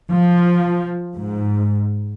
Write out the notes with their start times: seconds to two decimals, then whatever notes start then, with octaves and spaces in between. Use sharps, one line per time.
0.11 F3
1.14 G#2